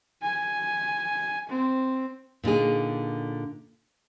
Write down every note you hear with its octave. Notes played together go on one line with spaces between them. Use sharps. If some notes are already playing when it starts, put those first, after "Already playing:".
G#5
C4
A#2 D3 D#4 G#4